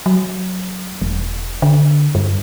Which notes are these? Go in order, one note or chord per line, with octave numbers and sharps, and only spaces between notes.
F#3
E1
D3
G2